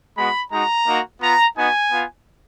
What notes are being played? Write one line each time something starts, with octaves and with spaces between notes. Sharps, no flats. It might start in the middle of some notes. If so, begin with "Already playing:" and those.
G#3 B3 F#4 B5
G#3 D#4 F#4 A#5
A#3 D#4 F#4
B3 F4 A#5
B3 D#4 F#4 G#5
B3 F4